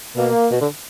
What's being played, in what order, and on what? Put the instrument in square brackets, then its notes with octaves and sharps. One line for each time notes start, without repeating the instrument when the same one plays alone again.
[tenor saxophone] B2 [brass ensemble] A#3
[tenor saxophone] B2
D3